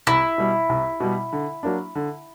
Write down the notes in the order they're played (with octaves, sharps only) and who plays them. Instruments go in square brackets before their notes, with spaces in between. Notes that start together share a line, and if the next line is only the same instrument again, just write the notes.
[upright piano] C2 [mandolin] E4
[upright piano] B2 G3
C2
B2 G3
D3
F#3 A#3 D4
D3